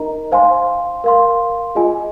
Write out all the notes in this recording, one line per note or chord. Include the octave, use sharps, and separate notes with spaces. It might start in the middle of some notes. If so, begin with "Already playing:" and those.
Already playing: D#4 A#4 D#5 A#5
C5 F5 G#5 C6
A#4 F5 C6
F4 G#4 D#5 G#5